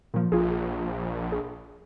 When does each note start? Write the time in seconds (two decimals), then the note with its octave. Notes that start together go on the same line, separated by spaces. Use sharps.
0.14 A#2 F3
0.32 A#1 F4 G#4
1.32 G#4